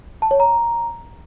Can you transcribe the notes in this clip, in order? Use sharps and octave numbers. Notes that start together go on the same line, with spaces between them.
A5
C#5
A#5